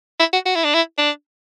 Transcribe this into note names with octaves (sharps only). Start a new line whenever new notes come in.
E4
F#4
F#4
E4
D4
E4
D4